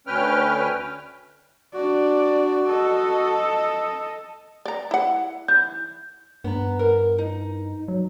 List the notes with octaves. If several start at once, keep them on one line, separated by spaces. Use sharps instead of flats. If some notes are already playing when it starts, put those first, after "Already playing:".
D2 C#4 B4 G5 F6
D4 F#4 D5
A4 D#5
D5 A#5
E4 F#5
E3 G6
G2 B3 A#5
A#4
D#4
F#3